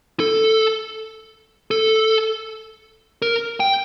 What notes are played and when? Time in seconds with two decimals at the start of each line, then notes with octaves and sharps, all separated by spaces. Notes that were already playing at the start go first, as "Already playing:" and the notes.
0.20 A4
1.71 A4
3.22 A#4
3.60 G5